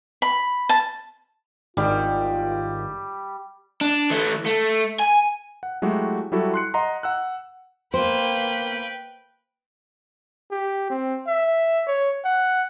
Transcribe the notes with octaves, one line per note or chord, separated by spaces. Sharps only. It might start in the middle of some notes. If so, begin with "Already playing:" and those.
B5
A5
G#1 D#3 G3 F4
D4
E3 A3
A3
G#5
F#5
F#3 G#3 A3 E4 F#4 G4
F#3 G3 E4 F#4 A4
C6 F#6 C#7
D#5 F#5 A#5 C6
F#5 E6 F#6
A#3 B4 C5 G5
G4
C4
E5
C#5
F#5